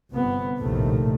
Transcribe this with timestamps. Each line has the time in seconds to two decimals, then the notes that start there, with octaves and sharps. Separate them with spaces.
0.12 G1 C3 B3
0.59 A#1 D#2 A2 C3 D#3 A3